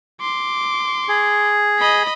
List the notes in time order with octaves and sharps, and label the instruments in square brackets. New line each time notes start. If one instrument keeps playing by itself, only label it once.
[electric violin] C6 D6
[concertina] G#4
[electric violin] D#5 B5